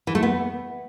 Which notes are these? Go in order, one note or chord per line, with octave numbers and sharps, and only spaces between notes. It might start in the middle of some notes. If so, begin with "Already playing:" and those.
E3
A3
B3